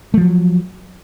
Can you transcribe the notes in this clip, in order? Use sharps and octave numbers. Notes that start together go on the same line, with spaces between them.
F3 F#3 A3